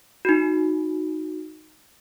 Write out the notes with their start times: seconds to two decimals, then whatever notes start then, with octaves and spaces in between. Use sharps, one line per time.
0.25 D#4 F#4